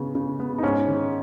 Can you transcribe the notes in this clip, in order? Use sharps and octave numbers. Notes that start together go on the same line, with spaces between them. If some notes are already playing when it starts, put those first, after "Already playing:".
Already playing: C#3 B3
C#3
B3
D#4
G#2 C#4
D#3